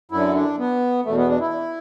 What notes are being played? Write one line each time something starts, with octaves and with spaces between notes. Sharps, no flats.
F#2 D3 E4
D4
B3
E2 B2 A3
B3
D4
E4